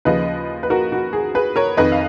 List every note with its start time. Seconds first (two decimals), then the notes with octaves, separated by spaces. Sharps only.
0.05 D#2 C#3 F3 B4 D#5
0.63 B4
0.70 F#4 A#4
0.92 F#4
1.13 G#4
1.35 G#4 B4
1.56 A#4 C#5
1.77 F2 D#3 B4 D#5
1.92 F5